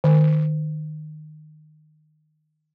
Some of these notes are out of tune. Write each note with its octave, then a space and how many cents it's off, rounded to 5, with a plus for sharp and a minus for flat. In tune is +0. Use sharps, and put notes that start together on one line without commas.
D#3 -20